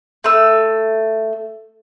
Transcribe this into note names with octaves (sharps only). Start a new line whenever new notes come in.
A3 E6